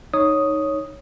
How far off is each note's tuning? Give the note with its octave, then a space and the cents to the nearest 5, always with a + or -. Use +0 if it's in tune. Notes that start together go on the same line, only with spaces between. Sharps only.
D#4 +0 C#5 +0 D#6 +0